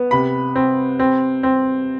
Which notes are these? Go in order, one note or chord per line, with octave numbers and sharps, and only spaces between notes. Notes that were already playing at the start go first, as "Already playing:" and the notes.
Already playing: B3
C3 B5
C4
C4
C4